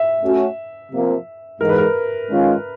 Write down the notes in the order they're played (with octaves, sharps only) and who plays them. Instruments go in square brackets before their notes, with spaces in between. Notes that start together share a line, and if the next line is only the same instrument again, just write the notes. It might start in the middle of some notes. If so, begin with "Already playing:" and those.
Already playing: [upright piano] E5
[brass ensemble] A3 C#4 F#4
C3 F3 A#3
[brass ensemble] G#2 E3 G#3 [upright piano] A#4
[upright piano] B4
A#4
[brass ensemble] D#3 G#3 C#4 F4